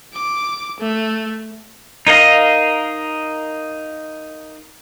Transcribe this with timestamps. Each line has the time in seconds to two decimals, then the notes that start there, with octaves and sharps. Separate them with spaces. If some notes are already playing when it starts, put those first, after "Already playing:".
0.14 D6
0.80 A3
2.07 D#4 A#4 D#5 F5 A#5